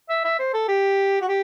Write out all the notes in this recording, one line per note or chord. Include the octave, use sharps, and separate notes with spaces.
E5
E5
C5
A4
G4
F#4
G4